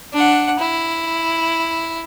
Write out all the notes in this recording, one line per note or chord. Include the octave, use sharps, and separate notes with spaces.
D4 F#5
E4